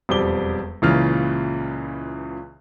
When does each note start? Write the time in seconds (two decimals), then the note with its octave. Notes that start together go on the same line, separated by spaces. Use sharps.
0.09 E1 F2 G3 C4 D6 G7
0.82 C#2 A#2 C#3 E3 F4 F6